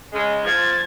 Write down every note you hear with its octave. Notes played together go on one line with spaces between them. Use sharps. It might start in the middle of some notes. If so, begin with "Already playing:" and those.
C#3 G#3
F3 G#6 A6